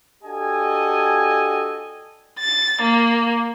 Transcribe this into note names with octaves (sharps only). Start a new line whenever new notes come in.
D4 F#4 G4 A4 D#5 G#5
A6
A#3